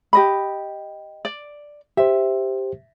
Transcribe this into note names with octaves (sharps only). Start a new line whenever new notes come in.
G4 D#5 B5
D5
G4 C5 E5